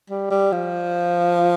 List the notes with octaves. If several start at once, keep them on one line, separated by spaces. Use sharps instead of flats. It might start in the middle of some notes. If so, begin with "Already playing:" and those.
G3
G3
F3